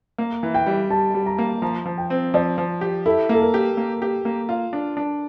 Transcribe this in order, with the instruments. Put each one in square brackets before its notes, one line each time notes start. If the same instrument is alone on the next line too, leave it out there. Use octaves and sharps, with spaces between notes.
[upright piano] A#3
E3
[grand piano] G5
[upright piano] G3
[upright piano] G3 [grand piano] A5
[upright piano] G3
[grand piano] A#5
[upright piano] A#3
[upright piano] F3 [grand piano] A#5
[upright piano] F3
[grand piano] G5
[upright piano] C4
[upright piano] F3 [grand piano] D5
[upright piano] F3
G4
[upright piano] E4 [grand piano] A4
[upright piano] A#3
[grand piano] A4
A#4
[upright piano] G4
A#3
G4
A#3
F4
D4
D4